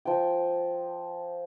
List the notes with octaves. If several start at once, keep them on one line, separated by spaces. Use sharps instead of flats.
F3 G5